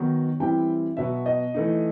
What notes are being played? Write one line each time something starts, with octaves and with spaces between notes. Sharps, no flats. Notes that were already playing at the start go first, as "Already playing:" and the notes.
Already playing: D#3 F#3 B3 D#4
E3 G3 C4 E4 G5
B2 F#3 B3 E5
D#5
E3 A3 D#4